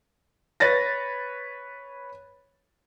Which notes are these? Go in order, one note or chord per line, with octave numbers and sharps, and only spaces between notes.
B4 C#5 A6 A#6